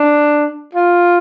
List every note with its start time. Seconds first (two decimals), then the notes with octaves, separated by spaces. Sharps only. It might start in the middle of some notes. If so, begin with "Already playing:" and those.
Already playing: D4
0.75 F4